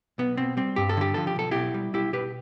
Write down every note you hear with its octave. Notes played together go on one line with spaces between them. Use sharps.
B1 B3
B2 C4
G3 C4
G2 G4
A4
D3 G4
F3 A4
G4
B1 A4
B2 E4 G4
G3
B1 E4 G4
B2 G4 B4